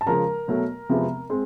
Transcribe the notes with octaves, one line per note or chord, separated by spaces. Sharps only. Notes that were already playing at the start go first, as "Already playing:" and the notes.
A5
C#3 F3 G#3 A#4 A#5
B2 F#3 A3
E2 C3 F3 G#3 B3
G#3 C4